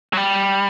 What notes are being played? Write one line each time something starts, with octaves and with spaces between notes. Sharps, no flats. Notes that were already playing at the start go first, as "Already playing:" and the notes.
F#3
G3